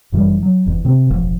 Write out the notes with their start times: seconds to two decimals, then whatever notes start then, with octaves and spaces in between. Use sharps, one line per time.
0.12 G1 F#2 E3 G3
0.43 F#3
0.66 F1 E2
0.85 C3 C4
1.10 E1 A1 F3